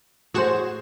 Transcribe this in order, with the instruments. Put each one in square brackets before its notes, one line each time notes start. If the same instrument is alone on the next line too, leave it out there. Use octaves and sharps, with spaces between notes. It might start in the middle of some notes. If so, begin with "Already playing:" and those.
[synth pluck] A2 F#4 E7 [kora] G#4 C5